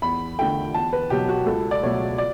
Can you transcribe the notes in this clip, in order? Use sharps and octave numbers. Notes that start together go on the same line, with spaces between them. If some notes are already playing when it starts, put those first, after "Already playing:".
E2 B5
D3 A3 G5
E2 A5
B4
B2 F#3 G4
F#4
C#2 A4
D5
B2 F#3 A3 C#5
D5